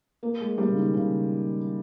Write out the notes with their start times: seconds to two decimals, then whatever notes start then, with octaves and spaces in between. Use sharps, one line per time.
0.23 A#3
0.41 G#3
0.58 G3
0.68 C#3
0.77 D#3
0.94 C#3